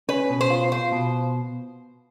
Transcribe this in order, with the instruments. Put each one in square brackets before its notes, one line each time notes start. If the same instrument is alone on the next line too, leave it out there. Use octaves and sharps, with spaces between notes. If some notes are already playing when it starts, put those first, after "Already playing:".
[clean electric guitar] C#4 [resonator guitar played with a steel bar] B4
[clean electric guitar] B2
[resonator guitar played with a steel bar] C5
[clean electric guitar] F4
[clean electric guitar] F4 [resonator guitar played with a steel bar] C5
[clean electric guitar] B2